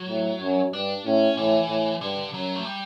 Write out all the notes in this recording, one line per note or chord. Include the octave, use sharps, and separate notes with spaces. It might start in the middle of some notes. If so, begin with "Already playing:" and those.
Already playing: F#3
A2
F#2
G2 D4
A2 C#4
A2 E3
A2
G2 D3
F#2 F#3
A3
G3